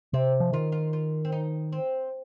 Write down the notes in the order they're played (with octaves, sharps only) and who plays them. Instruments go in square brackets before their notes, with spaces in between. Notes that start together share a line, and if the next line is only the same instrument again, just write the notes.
[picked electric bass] C3 [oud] C4
[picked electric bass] F3
[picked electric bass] D#3 [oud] F4
[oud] F4
F4
C4
D#4
C4